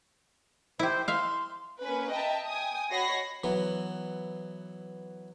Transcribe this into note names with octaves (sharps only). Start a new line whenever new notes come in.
E4 G4 C5
E5 F5 C6
A#3 C#4 B4
D#5 E5 G5 A5 A#5
G5 G#5 D#6
F#4 C#5 D#5 B5 A#6 C7
E3 F#3 B3